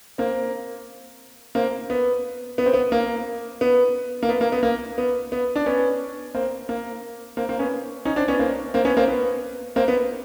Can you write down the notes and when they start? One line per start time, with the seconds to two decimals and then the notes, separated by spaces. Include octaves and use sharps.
0.18 A#3 C4
1.55 A#3 C4
1.90 B3
2.58 B3
2.66 C4
2.73 B3
2.92 A#3
3.61 B3
4.23 A#3
4.29 B3
4.41 A#3
4.52 B3
4.63 A#3
4.98 B3
5.32 B3
5.56 D4
5.66 B3 C#4
6.34 A#3 C4
6.69 A#3
7.37 A#3 C4
7.49 A#3 C4
7.59 B3 C#4
8.05 C#4 D#4
8.16 C4 D4
8.28 B3 C#4
8.39 A#3 C4
8.74 A#3 C4
8.85 B3 C#4
8.97 A#3 C4
9.08 B3
9.76 A#3 C4
9.88 B3